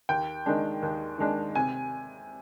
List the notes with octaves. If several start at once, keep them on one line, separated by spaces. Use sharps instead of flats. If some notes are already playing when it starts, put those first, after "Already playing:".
D#2 G5
D#3 G#3 D4
D#2
D#3 G#3 D4
C3 G#5